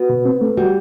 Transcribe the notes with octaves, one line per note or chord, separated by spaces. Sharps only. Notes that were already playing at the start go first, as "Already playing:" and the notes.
Already playing: B3 F#4
B2
C4
A3
G3 F#4